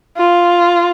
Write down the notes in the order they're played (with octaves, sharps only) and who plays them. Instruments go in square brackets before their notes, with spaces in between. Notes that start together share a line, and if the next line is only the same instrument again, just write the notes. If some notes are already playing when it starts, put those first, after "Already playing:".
[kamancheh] F4